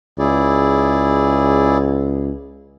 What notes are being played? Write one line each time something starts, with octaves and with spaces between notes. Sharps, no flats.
C#2 E4 G#4 D5